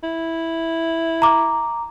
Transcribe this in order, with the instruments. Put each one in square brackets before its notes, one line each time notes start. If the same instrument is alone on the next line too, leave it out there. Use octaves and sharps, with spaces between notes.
[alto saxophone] E4
[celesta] A#5 D6